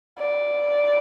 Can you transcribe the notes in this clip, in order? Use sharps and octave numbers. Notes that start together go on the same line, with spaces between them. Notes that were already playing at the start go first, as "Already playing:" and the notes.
D5